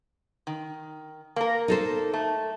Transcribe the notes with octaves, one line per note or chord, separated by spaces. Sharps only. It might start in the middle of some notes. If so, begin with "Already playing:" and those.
D#3
A#3 A#4
D#4 A4 C5
A3